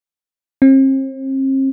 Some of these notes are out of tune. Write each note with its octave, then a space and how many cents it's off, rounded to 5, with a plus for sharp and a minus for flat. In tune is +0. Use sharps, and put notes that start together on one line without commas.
C4 +40